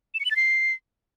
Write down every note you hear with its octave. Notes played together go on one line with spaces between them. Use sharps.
E7
C#7
F#7
A6
C7